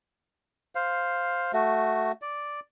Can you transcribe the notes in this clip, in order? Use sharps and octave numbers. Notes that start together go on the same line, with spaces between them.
C5 F5
A3 F#4
D5